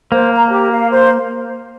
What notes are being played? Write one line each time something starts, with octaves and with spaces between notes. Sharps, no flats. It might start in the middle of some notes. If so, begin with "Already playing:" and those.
A#3 C5
A#5
G4
F5
C5